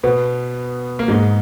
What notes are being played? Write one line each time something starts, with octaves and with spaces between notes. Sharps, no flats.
B2 B3
A#3
G#2 G#3